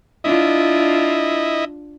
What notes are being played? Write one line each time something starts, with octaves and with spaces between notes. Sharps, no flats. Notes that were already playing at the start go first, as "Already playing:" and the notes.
D4 E4 F4 D#5